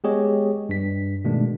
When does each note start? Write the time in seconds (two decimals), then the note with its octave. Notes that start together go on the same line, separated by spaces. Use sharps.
0.04 G#3 B3 G4 G#4 C#5 D#5
0.69 G2 B6
1.24 B2 D#3 G#3 A3 D4